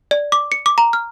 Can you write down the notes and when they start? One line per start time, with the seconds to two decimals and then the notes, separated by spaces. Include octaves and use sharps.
0.11 D5
0.32 D6
0.52 C#7
0.66 D6
0.78 A#5
0.93 F6